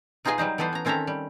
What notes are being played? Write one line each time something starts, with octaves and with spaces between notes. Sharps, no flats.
B2 D#4 F4 G#4 D#5 G#5
F#3 G3 D#4 C5
E3 B3 A4 B4 C5
C#4 A#5
D#3 C4 C#4 A4 E5 A#5
G3